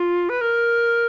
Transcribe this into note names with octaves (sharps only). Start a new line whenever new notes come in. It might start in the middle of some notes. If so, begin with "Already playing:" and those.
Already playing: F4
B4
A#4